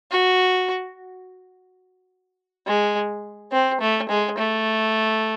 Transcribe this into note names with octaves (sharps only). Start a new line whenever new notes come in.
F#4
G#3
C4
A3
G#3
A3